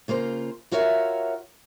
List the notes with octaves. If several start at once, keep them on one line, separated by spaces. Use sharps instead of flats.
C#3 A#3 F4 C5
F4 F#4 A#4 C#5 E5 F5